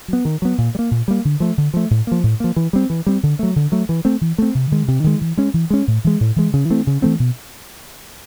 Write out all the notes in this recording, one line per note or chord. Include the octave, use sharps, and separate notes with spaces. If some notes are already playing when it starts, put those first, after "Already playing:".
F#3 B3
D#3
F#3 B3
A#2
G3
A#3
A#2
G3 A#3
D3
F3 A3
D3
F3 A3
A2
F3 A#3
A2
F3 A#3
E3
G3 C4
E3
G3 C4
D3
F#3 A3
D3
F#3 A3
E3
A3 C4
E3
A3 C4
C3
D#3 G#3
C3
D#3 G#3
E3
G#3 C#4
E3
G#3 C#4
A2
E3 G#3
A2
E3 G#3
C#3
E3 A3 C4
C#3
E3 A3 C4
B2